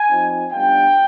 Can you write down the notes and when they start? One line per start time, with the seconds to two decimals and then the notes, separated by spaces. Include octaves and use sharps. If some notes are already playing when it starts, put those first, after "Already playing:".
Already playing: G#5
0.10 F3 C4 D#4
0.52 G3 B3 D4 F4 G5